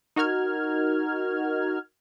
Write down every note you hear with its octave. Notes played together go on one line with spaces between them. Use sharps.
D#4 F#4 A#4 F6 G#6